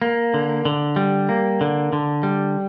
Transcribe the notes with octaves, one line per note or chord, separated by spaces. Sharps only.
A#3
D3
D3
G3
A#3
D3
D3
G3